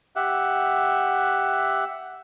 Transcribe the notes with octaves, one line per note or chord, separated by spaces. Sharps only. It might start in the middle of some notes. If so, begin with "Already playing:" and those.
G4 E5 F#5